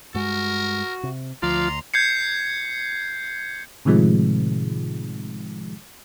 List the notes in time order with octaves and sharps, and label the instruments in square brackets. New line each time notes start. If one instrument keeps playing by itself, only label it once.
[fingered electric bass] G2 G#3 [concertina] F#4 [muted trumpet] A#4
[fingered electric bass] C3
[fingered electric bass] D2 [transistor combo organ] F3 F4 [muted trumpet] D5 [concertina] A#5 C6
[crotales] G6 G#6 C7 C#7
[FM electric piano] A2 C3 D#3 F3 G#3